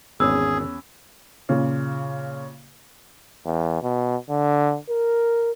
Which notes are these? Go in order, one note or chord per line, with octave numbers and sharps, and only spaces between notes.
G#1 E2 C#4 G#4 E6
A#2 C#3
E2
B2
D3
A#4